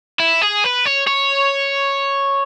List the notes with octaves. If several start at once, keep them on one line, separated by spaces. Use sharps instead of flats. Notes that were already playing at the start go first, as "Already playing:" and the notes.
E4
G#4
B4
C#5
C#5